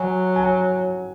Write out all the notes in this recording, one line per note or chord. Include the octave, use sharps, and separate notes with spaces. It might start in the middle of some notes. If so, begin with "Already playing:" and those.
Already playing: F#3 G#5
G#5